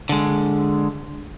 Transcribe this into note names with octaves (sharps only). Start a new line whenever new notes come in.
D3 G#3